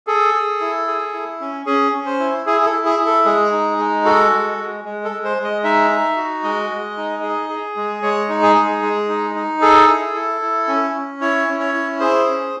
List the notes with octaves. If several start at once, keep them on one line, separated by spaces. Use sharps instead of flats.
G#4 A4
G#4
E4
G#4
E4
C#4
C#4 G#4
C#4
C5
E4
E4 G#4
G#4
A4
E4
G#4
E4
A4
G#3 G#4
D#4
G#3
F#4 A4
G#3
G#3
G#3
A4
G#3
C5
G#3
D#5
D#4 E5
D#4
F#4
G#3 D#5
G#3
D#4
G#4
G#4
G#3
G#3 C#5
D#4
G#4
G#3
G#3
D#4
D#4
G#4 A4
E4
E4
E4
C#4
C#4
E4 C#5
C#4
C#5
E4
G#4 C5
C#4